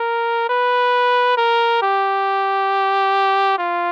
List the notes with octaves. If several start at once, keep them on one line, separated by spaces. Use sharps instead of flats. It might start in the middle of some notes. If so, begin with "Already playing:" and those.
Already playing: A#4
B4
A#4
G4
F4